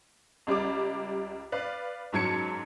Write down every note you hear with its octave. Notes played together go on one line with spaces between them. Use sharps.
C#2 G3 D5 D6
B4 D5 F5
F#1 G#2 F#3 A5 G#6 C#7